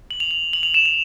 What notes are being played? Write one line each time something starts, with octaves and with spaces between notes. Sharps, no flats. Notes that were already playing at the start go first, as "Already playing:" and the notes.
F#7
F7
F7
F#7
F7
E7
F7